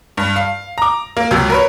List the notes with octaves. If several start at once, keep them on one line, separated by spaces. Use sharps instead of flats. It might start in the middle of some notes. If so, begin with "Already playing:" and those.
G2
F5
A#5 D6
A#3
C#2 C3 F#3
A#4 B4 C#5